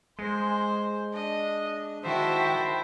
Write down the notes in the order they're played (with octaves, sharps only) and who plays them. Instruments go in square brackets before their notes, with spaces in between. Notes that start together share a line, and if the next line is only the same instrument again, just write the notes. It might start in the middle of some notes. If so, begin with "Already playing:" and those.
[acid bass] G#3 [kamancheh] C5
[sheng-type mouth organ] D4 [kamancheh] D#5
[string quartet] D#3 G5 A5 [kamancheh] E4 F#4 [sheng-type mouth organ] C5 E5